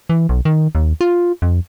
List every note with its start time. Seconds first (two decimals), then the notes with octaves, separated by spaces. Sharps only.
0.10 E3
0.29 B1
0.45 D#3
0.75 D#2
1.01 F4
1.42 F2